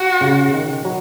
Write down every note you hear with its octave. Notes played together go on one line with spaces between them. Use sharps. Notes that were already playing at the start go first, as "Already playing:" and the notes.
Already playing: F#4
C#3
D#3
F#3